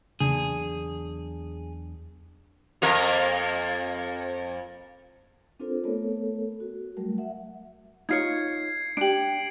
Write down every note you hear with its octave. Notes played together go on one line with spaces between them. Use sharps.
E2 C#3 F#3 A#3 D4 G#4
F2 A#3 A#4
C4 D4 F4 A4 A#4 C5
A3 B3 A4 A#4 C#5
F#4
F#3 G3 A3 A#4
E5 F#5
D#4 F4 C#5 G#6 C7 C#7
D4 G4 D7 F#7